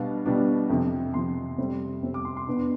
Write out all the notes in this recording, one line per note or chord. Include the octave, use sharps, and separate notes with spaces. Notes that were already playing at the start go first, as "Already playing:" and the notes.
Already playing: B2 G3 B3 D4 F5
B2 G3 B3 D4
F2 C3 F3
F2 C3 F3 C6
F2 C3 G3 C4
F2 C3 G3 C4
D6
C6
C6
E2 B2 B3 D4